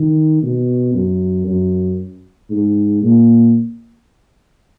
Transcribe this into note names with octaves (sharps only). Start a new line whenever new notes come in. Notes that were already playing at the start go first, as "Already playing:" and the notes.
Already playing: D#3
B2
F#2
F#2
G#2
A#2